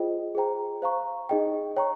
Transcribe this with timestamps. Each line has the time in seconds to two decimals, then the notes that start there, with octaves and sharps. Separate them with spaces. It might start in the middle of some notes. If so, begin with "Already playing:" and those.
Already playing: F4 G#4 C5 D#5 G5
0.35 G#4 C5 G5 A#5
0.82 C5 F5 A#5 C#6
1.29 D#4 G#4 D#5 G5
1.76 C#5 G5 A#5 C#6